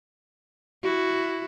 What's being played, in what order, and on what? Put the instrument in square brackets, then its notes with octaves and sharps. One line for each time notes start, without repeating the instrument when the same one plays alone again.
[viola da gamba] E4 F#4